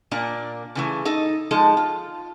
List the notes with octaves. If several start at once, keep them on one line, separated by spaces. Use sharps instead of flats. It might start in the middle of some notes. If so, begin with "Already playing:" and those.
A#2 A#3 D4 A#5
C#3 E3 A3
D#4 A4 D#5
F3 G#3 D#4 A4
F4